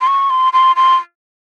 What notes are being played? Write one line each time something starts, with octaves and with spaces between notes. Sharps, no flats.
C6
C#6
C6
C6
C6